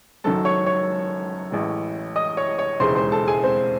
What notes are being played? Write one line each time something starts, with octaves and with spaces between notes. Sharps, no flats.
F#1 F#2 D#3 F#3 A4 A5
C#5 C#6
C#5 C#6
A1 A2 E3 G#3
D#5 D#6
C#5 C#6
C#5 C#6
E1 D#2 C#3 E3 G#3 C5 C6
C5 C6
A4 A5
G#4 G#5
C4 C5